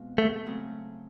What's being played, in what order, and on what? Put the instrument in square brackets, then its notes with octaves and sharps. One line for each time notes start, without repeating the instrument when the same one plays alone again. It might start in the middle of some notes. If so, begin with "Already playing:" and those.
Already playing: [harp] B2 G#3 C4 F4
[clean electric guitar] A3
[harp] C#3 F#3 A3 C4